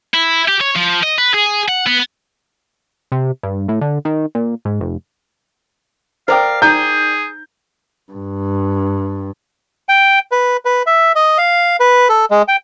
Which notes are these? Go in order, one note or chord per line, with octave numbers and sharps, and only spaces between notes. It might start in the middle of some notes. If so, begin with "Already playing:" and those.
E4
G4
C#5
F3
D#5
B4
G#4
F#5
B3
C3
G2
A2
D3
D#3
A#2
G#2
F1
A#4 C5 D5 F5 G5 D#6
D#4 G#4 A#5 G6
G2
G5
B4
B4
E5
D#5
F5
B4
A4
G#3
G5